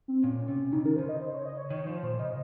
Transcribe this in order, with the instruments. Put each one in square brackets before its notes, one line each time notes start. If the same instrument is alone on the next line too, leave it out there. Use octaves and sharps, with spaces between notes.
[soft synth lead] C4
[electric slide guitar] A#2 [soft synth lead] C#4
[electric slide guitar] C3 [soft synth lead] C#4
[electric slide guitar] C#3 [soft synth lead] D#4
[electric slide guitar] D#3 [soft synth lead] A#4
[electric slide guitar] C#3 [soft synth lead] C5
[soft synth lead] D#5
C5
C#5
D#5
C#5
[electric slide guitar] D#3 [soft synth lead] C#5
[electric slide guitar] F3 [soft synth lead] C5
[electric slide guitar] A#2 [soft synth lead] C5
[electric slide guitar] C#3 [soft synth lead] D#5